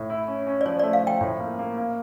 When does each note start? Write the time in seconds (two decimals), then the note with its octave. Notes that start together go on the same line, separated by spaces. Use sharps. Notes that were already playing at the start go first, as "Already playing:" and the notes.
Already playing: A2
0.10 E4
0.28 C#4
0.47 C#4
0.61 D5
0.66 F3 C#5
0.79 D5
0.83 A3
0.93 F5
1.03 F3 G5
1.21 A2
1.40 A#3
1.59 A#3
1.78 A#3